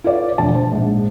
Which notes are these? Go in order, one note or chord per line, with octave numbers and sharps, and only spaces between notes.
F4 A4 B4 C#5 D5 F5
E1 D2 F3 A5
C5
A#1 G#2